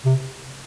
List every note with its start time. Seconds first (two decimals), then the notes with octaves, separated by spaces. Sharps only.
0.05 C3